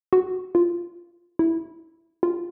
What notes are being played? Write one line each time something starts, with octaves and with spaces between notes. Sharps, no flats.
F#4
F4
E4
F4